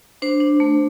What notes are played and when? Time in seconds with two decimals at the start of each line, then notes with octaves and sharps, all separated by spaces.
0.22 D4 C5
0.40 D4
0.60 A3